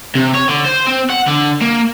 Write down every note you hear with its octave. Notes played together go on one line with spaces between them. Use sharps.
C3
C#5
D3
C5
C4
F#5
D3
A#3